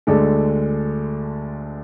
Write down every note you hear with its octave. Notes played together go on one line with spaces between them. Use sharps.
D2 D3 G#3 D4 A4